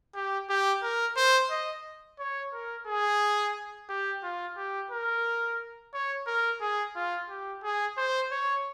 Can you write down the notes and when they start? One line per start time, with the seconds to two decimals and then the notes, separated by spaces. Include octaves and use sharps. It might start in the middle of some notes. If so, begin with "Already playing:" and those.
0.15 G4
0.49 G4
0.83 A#4
1.17 C5
1.51 D#5
2.19 C#5
2.53 A#4
2.87 G#4
3.89 G4
4.23 F4
4.57 G4
4.91 A#4
5.93 C#5
6.27 A#4
6.61 G#4
6.96 F4
7.29 G4
7.63 G#4
7.97 C5
8.31 C#5